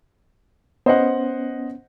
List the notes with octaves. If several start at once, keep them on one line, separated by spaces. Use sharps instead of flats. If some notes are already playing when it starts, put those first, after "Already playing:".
B3 C#4 C5 D#5 F#5